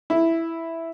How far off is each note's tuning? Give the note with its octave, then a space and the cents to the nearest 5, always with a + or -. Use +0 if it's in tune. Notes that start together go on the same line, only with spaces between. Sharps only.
E4 +0